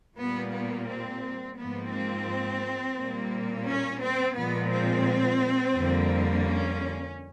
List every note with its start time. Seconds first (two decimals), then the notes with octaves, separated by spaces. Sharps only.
0.18 A#2 G3 A#3 B3
0.53 B3
0.88 C4
1.58 G#2 F3 A#3 B3
1.92 C4
2.97 A#2 G3 A#3
3.67 C#4
4.01 C4
4.36 A#2 F3 G#3 B3
4.71 C4
5.75 F2 D3 G3 A#3
6.45 C#4